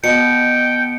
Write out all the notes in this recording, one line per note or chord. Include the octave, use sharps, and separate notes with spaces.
B2 G5 C#7